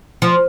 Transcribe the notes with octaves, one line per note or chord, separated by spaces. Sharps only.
F3